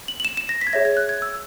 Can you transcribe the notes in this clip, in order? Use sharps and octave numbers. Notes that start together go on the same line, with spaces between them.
F#7
F#7
E7
E7
A#6
B6
G#6
G#4 C#5 E5 A#6
G#6
F#6
G#6
E6